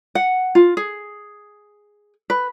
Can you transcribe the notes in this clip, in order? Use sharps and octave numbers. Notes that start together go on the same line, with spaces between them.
F#5
F4
G#4
B4